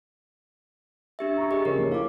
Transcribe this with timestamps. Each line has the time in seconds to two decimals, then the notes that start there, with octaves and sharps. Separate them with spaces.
1.19 D4 G4 E5
1.37 A#5 C#6
1.51 G4 G#4 D#5
1.65 C#3 F3 A#4 C#5
1.78 A#1 D#4
1.92 E4 A4 C#5 F5 D6